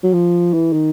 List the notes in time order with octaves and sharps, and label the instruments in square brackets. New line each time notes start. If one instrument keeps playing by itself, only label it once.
[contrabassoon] F#3
F3
E3
D#3